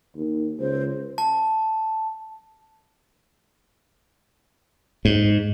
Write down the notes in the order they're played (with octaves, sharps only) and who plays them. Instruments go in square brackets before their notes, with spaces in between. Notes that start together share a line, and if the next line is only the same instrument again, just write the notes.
[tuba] D#2
[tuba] C#2 [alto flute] C5
[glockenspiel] A5
[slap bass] G#2